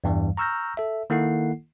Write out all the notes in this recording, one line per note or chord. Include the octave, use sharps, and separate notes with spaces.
E2 G2 E3 G3
A#5 C#6 E6 F6 G6 A#6
A4 E5
D#3 A#3 E4 A4 F#5 C7